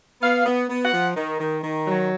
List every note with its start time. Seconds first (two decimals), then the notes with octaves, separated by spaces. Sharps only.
0.22 B3 F5
0.45 B3
0.68 B3
0.84 F#5
0.92 F3
1.16 D#3
1.40 D#3
1.62 D#3
1.87 F#3